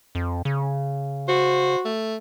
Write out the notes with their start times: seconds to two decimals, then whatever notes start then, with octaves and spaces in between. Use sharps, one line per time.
0.15 F2
0.45 C#3
1.28 F#4 C5
1.85 A3